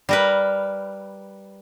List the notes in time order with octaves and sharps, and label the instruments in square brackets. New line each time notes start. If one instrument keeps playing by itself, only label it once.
[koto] G3 A#4 B4